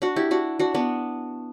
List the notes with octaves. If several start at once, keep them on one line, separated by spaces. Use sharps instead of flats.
D4 F#4
E4 G4
D4 F#4
D4 F#4
B3 D4